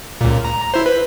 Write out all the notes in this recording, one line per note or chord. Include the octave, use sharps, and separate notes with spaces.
C#2 A#2
A#5
E4 C5
B4